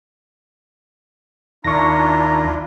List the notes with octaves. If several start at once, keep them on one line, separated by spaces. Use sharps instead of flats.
D#2 D#3 D4 E4 F4 A#5 C#6 A#6